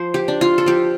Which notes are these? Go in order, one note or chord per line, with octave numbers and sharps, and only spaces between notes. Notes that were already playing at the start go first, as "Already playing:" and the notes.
Already playing: F3 C5
G4
D4
F4
A4
F3 G4